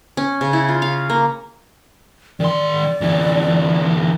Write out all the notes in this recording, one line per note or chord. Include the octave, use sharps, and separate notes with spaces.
C#4
C#3
E4
F4
F5
A#3
D#3 D5 C6
D2 E3